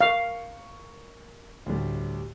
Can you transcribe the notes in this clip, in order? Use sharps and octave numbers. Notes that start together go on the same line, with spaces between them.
A#4 F5 C#6
D2 A2 G3